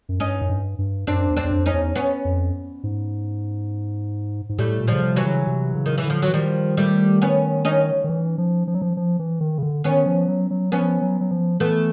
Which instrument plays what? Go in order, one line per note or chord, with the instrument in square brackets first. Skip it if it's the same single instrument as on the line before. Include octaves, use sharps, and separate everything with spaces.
[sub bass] F#2
[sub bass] G2 [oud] C#4 D#4
[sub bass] F#2
G2
G2
[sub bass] F#2 [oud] C4 D4
[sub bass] E2
[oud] C4 D4
[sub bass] E2
F2
[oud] C#4 D#4
[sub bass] E2
[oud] B3 C#4
[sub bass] F2
G#2
G#2
[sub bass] A2 [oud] G3 A3
[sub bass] A#2
[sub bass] C#3 [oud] F3 G3
[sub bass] C3
[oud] E3 F#3
[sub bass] C#3
C3
C#3
[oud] D#3
E3
[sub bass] D3
[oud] F3
F#3
[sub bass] E3
[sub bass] D#3 [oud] F3 G3
[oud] G3 A3
B3 C#4
C#4 D#4
[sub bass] D#3
E3
F3
F3
F#3
F3
F3
E3
D#3
C#3
D3
[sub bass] D#3 [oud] B3 C#4
[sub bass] F3
F#3
F#3
[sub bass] F3 [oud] B3 C#4
[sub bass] F#3
F#3
F3
[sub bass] E3 [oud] A3 B3